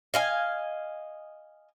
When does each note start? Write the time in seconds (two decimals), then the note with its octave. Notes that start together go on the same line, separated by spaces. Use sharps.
0.14 D#5 F5 G#5